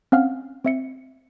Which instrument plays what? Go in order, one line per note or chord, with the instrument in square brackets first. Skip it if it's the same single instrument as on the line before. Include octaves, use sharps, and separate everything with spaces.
[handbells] C4 C#4 F5 F#5 F6
C4 E5 C#7